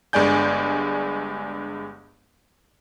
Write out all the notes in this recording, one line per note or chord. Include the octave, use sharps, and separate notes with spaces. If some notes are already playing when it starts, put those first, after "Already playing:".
G1 G2 G#3 D5 G#5 G6